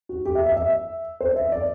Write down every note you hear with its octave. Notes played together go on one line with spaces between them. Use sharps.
F#4
G4
E5
E5
E5
C5
E5
D5